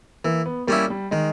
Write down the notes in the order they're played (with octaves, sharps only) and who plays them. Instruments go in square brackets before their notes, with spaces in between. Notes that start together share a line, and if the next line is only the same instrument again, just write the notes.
[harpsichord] E3 [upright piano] A#3
[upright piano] B3
[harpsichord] G3 C#4 E4 [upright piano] A#3
[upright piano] G3
[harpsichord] D#3 [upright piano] G#3